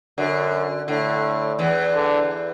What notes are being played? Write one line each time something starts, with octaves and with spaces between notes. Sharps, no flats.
F#2 D3
A2 D3
E2 E3
D3